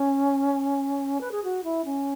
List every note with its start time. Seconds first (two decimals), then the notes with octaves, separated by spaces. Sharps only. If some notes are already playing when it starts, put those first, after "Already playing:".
Already playing: C#4
1.21 B4
1.31 G#4
1.44 F#4
1.64 E4
1.85 C#4